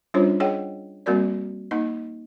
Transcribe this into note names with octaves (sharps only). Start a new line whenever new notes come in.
G3 C#4 D4 F4 C5 C#5
G#4 C#5 D#5 F#5 G5
G3 A#3 C4 F#4 A#4 D5
A#3 D#4 D#5